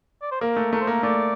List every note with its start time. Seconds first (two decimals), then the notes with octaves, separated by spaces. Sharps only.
0.22 D5
0.32 C5
0.41 A#3 A#4
0.57 A3
0.73 A3 A#4
0.81 C5
0.87 A#3 A#4
1.03 A3 D5